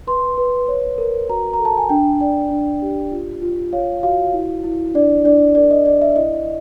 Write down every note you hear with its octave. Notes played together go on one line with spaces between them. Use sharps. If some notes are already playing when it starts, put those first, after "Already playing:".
B4 C6
B4
C#5
A#4
F#4 A#5
A#5
A4
A5
G#5
D4 G5
D5 G5
D4
G4
F4
F4
C#5 F5
F#4 F5
E4
E4
D4 D5
D4 D5
A#4 D5
D#5
D5
E5
E4 D#5